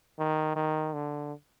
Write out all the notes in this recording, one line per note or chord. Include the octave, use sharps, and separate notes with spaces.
D#3
D#3
D3